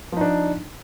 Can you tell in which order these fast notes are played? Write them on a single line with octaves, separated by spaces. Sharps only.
F3 D#4 D4